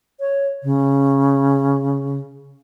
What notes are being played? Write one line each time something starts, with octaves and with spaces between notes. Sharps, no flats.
C#5
C#3